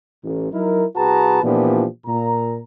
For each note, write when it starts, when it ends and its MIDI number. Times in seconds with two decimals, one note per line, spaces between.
0.24 0.52 33
0.53 0.84 54
0.53 0.84 63
0.53 0.84 64
0.53 0.84 70
0.96 1.43 36
0.96 1.43 66
0.96 1.43 68
0.96 1.43 71
0.96 1.43 81
0.96 1.43 82
1.43 1.86 46
1.43 1.86 52
1.43 1.86 53
1.43 1.86 59
1.43 1.86 62
1.43 1.86 67
2.06 2.59 46
2.06 2.59 82